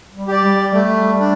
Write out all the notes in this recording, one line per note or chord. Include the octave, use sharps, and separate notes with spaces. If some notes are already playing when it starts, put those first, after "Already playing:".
G3
G4 D5
G3
G3 A3
D4